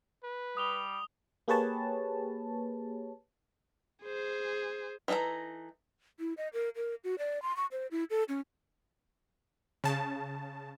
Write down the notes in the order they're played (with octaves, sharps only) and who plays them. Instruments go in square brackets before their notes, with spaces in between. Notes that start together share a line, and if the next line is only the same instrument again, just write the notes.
[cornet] B4
[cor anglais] G3 [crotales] D#6 F7 G7
[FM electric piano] A#3 G4 G#4 B4 C#5 A5
[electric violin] G#4 C5
[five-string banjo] E3 D#4 F#4 A4 A#5
[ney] E4
D#5
A#4
A#4
F#4
D5
C6
C#6
C5
E4
A4
C#4
[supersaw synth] C#3 A5